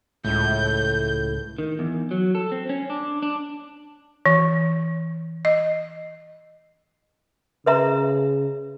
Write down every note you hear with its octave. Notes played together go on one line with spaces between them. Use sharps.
C#2 A2 G6
D#3
E2
F#3
A4
C4
C#4
D4
D4
E3
D#5
C#3 B4 E5 A#5